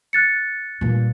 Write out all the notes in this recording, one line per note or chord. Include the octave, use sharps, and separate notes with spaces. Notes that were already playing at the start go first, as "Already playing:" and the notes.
F#6 A6 C#7
G2 A#2